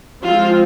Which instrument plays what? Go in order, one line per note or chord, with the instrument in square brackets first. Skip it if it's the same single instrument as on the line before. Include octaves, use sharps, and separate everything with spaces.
[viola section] F3 G#3 C4 F4